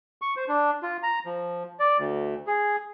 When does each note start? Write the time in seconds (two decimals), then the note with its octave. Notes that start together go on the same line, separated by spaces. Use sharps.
0.22 C#6
0.37 C5
0.48 D4
0.83 F4
1.03 A#5
1.26 F3
1.80 D5
1.98 D2
2.47 G#4